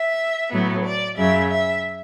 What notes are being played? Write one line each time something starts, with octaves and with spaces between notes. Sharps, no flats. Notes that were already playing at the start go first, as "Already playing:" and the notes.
Already playing: E5
A2 F#3 B3
D5
F#2 C#3 F#3 E5
E5